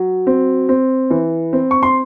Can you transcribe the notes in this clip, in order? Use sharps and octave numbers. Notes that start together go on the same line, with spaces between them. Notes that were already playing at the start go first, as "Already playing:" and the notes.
Already playing: F#3
C4
C4
E3
C4
C#6
C6